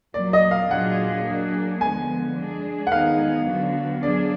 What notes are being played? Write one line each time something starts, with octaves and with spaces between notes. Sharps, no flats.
A#2 F#3 A#3 D5
D#5
F5
A#2 F#3 D4 F4 G#4 F#5
F#3 A#3 D4 G#4
D3 F3 G#3 B3 G#5
G#3 D4 G#4
F#5
D#3 G#3 B3 D#4 G#4 F5
D3 F#3 B3 D4 F#4
F#3 D4 G#4 D5